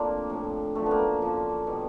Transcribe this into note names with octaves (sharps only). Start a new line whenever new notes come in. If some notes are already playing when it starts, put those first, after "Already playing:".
Already playing: A2 F3 A#3 C4 D4
A2 F3
F#2 D3 F3 A3
A#3 B3
F#2 D3 F3
B2 G3